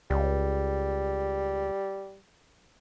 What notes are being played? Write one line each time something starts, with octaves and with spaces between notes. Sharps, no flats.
C#2 G3